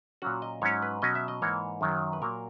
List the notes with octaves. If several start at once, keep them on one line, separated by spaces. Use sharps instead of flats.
A#2 F#3 C#4 F#4
D#5
G#2 F#3 C#4 C#5
B4
B2 F#3 C#4 D#5
E5
D#5
G#2 E3 A#3 C#5
F#2 D#3 F#3
B4
A#2 F#3 A#3 A#4